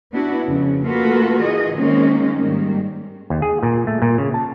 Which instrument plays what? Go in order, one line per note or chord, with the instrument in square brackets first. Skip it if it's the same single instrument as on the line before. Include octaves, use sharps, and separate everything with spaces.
[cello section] B3 D4 E4 F#4 B4
F2 C#3
A3 A#3 F4 F#4 A4 B4
E3 G#4 D#5
D#3 G#3 A#3 C4 C#4 D#4
G#2 D#3 G3 A#3
[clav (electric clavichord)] D#2
G#4
A#2
A3
A#2
C#3
A5